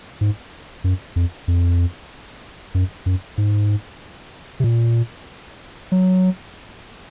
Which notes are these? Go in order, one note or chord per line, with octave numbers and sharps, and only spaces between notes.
G#2
F#2
F2
F2
F#2
F#2
G#2
C3
A#2
F#3